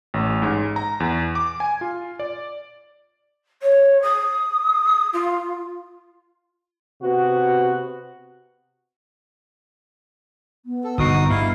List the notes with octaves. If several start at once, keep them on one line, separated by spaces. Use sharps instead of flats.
A1
G#2
A#5
E2
D6
G#5
F4
D5
C#5
D#6
F4
C3 B3 F#4
B3
A4
G1 B2 D#4 F#4 D#6
G2 E4 F5